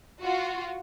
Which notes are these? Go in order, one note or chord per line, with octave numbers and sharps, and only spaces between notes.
F4 F#4